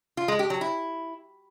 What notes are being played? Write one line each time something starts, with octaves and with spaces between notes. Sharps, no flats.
F4
G#3
G4
F#3
E4